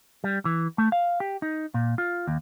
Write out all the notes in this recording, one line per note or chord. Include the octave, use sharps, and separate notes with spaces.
G3
E3
A3
F5
G4
D#4
A#2
F4
D#2